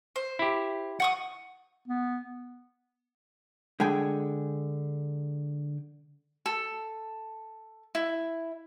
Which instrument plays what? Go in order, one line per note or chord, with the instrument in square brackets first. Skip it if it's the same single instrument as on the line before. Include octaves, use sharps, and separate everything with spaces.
[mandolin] C5
[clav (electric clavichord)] E4 G4
[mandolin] F#5 C#6 D#6
[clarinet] B3
[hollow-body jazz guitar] D3 G#3 G#4 G5 G#5
[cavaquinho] A4
E4